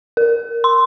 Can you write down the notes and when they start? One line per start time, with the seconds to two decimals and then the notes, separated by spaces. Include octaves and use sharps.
0.17 A#4
0.64 C6